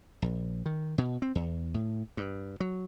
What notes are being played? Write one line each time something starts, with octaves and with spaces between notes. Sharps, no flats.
A#1
D#3
B2
C4
E2
A2
G2
F#3